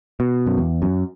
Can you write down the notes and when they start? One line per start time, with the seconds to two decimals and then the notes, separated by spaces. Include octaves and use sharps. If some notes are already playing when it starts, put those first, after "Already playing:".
0.20 B2
0.47 F#2
0.58 E2
0.82 F#2